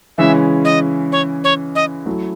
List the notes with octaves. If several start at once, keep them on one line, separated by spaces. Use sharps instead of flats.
C#3 E3 G#3 C#4 E4 E5
D#5
C#5
C#5
D#5
F#3 A3 E4